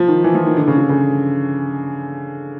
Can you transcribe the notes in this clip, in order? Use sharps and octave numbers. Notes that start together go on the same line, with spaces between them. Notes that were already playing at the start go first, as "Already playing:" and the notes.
Already playing: F3
D#3
E3
F3
D#3
D3
C#3
D3
C#3